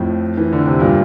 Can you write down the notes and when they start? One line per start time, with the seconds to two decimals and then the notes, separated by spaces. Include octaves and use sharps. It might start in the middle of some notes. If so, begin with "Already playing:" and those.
Already playing: F2 A2
0.37 E3
0.52 D3
0.66 C3
0.79 G2 A#2